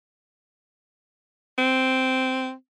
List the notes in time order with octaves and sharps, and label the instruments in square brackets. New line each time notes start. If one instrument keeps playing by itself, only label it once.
[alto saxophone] C4